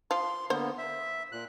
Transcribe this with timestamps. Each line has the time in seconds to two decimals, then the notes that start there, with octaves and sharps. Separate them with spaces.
0.11 F3 C6
0.50 D3 A#3 B3 C5
0.78 E5
1.32 A#2 F#6